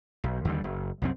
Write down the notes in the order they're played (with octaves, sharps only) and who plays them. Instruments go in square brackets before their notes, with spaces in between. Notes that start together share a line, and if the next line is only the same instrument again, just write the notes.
[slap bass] B1
D#2 D3 G3
F#1
C2 F#2 C4